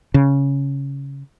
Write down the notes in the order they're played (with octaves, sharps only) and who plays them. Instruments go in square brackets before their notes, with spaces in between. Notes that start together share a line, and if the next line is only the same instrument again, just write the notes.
[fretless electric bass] C#3